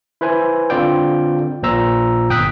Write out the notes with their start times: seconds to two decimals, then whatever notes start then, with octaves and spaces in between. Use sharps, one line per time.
0.21 E4 B4 C5 G#5
0.70 D3 C4 F4 D5 G5
1.63 A#1 A#2 C5 A#5 E6
2.30 G1 G5 D#6 F#6 B6